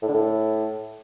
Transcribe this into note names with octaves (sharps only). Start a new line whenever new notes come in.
A2
D3
A2